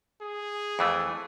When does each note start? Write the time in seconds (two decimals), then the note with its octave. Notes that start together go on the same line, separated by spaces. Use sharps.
0.21 G#4
0.79 F2 E3 A3